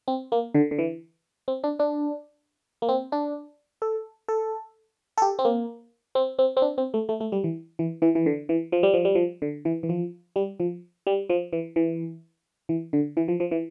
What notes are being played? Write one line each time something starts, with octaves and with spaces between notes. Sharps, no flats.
C4
A#3
D3
D3
E3
C4
D4
D4
A#3
C4
D4
A4
A4
A4
G4
C4
A#3
C4
C4
C4
D4
C4
A3
A3
A3
G3
E3
E3
E3
E3
D3
E3
F3
G3
F3
G3
F3
D3
E3
E3
F3
G3
F3
G3
F3
E3
E3
E3
D3
E3
F3
F3
E3